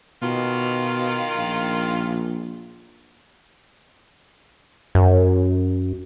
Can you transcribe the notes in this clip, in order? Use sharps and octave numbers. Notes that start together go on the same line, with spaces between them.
B2 D#3 F4
A#1
F#2